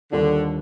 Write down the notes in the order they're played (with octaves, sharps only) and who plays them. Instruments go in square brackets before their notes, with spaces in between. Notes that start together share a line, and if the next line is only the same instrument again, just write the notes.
[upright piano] D#2 D#3 G3 D4 F4 [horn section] D3